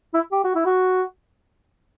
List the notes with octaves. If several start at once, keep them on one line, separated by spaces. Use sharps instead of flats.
E4
G4
F#4
E4
F#4